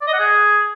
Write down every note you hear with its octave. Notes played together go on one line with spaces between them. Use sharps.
D5
D#5
F#5
G#4